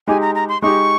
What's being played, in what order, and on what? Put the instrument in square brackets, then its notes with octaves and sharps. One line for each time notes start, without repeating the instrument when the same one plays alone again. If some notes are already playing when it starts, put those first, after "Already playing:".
[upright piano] G#3 D#4 G4 [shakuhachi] G#5
[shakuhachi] A#5
A#5
C6
[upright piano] G#3 D#4 G4 [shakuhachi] C#6